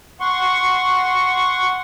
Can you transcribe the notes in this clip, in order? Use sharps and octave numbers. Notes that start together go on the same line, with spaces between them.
F#5 C6 C#6